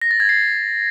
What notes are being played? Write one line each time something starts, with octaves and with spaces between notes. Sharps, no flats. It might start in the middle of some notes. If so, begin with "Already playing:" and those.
A#6
A6
G#6
C7